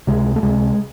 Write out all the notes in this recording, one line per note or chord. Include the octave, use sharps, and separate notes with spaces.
C#2 C3 G#3
A3
C#2 C3 G#3